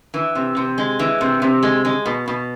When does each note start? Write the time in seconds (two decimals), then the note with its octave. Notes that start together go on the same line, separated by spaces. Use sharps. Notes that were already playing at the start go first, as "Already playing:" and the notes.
0.14 E3
0.35 C3
0.57 C3
0.78 G#3
0.99 E3
1.21 C3
1.42 C3
1.63 G#3
1.85 G#3
2.06 B2
2.28 B2